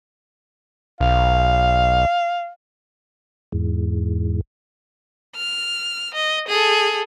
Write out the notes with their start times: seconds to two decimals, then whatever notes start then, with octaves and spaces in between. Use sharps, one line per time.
1.01 B1 F5
3.52 E2 G#2
5.35 F6
6.14 D#5
6.48 G#4 A4